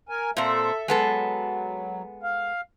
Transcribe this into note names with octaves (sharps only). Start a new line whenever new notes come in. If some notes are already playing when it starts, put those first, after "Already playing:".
A#4 G#5
A#2 C4 A4 E5
F#3 G#3 B3 A4
F5